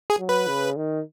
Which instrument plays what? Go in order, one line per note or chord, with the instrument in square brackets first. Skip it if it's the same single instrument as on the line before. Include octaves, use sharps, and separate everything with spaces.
[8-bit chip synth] G#4
[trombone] F#3
[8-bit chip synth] B4
[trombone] C#3
D#3